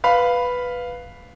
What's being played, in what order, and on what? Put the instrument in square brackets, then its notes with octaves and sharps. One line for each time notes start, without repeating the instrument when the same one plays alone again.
[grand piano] B4 F5 B5